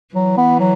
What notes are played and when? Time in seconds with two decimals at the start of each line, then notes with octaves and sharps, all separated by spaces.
0.15 E3 F#3
0.37 B3
0.60 F#3